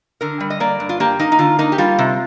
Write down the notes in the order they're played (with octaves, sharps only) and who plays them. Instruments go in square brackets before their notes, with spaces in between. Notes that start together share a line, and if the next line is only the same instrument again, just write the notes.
[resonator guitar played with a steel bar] D3 A#4
G3
D#5
A#3 D5
G2
F4
A#3 G4
A#3 D#4
D#4
D3 F4
A#3 D#4
G4
G3 F4
C3